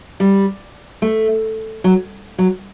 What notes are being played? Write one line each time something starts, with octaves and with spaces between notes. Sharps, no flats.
G3
A3
F#3
F#3